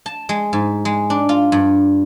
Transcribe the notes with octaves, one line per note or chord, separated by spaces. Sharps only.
A5
G#3
G#2
G#3
D4
F4
G2